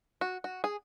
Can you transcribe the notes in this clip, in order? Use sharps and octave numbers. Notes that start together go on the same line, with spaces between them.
F#4
F#4
G#4